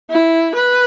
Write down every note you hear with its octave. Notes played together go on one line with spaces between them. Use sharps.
E4
B4